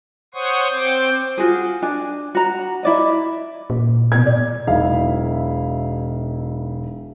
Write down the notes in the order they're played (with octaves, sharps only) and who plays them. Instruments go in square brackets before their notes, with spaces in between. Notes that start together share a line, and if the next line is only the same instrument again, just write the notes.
[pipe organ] C5 C#5 F#5 C6 C#6 D#6
C4 C5 D6 G6
[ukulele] F4 F#4 G#4
D4 G#5
F#4 A#5
E4 D5 D#5
[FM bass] A#2
[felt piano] B2 G#6
D5
[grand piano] E1 B1 D#4 E4 E5 F5